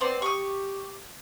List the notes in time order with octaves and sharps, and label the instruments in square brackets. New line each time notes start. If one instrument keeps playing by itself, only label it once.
[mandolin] B3 C5 D5 [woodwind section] C4
[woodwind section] G4 [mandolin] C#6 D#6